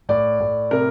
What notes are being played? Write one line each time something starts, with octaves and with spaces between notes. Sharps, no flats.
A2 D5
A2
C3 A#4